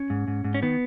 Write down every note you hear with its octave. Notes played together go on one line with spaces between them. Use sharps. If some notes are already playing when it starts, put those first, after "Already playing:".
Already playing: C#4
G#2
G#2
G#2
C#4
D#3 B3